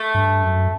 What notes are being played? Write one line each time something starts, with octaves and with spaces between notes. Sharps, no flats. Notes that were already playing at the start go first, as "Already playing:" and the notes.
Already playing: A3
G2
F#2